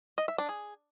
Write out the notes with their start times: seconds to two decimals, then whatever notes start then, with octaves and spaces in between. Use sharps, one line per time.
0.18 D#5
0.28 E5
0.38 D4
0.49 G#4